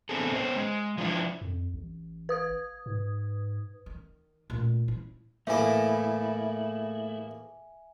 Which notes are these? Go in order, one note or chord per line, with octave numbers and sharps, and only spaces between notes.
A3 B3 C4 D4 G#4 A4
B3 C#4 C5
G#3
F3 D4 E4
F2
A1
B4 D#6 G#6
G#2
D#3
D2 A#2
E4
E2 A2 A3 A#3 E4 E5 G#5